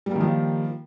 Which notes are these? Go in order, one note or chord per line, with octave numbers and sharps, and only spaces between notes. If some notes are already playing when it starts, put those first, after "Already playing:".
D#3 F3 G3 A#3